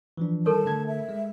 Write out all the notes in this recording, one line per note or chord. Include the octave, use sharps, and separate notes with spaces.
E3 F3 D4
D#3 G3 A4 A#4 C#5 A5
D3 A3 G#6
E5
G#3